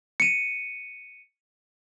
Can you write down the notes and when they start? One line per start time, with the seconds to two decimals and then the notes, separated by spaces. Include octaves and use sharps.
0.20 C#7 D#7